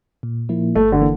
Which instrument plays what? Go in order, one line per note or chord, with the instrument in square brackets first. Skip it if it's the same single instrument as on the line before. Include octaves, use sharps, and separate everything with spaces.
[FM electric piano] A#2
F3 A#3 E4
[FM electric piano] G1 [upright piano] A3
[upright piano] D3
[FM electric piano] E3 A#3